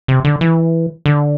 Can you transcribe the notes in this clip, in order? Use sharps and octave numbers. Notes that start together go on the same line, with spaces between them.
C3
D3
E3
D3